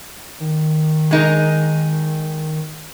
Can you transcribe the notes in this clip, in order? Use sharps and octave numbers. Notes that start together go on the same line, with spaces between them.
D#3
G#3 D#4 A#4